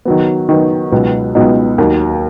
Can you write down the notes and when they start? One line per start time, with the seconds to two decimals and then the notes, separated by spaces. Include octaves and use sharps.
0.05 D#3 F#3 B3
0.49 D#3 F#3 B3
0.92 C#2 B2 F#3 B3 D#4
1.35 C#2 B2 F#3 B3 D#4
1.78 D#2 D#3 F#3